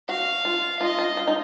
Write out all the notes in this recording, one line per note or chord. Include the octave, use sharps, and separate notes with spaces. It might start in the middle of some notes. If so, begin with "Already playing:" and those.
F#4 F5
F4
F4 D#5
F4
F4
D#4